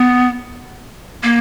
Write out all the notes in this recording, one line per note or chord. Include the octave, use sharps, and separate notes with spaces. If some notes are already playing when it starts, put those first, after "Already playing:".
Already playing: B3
A#3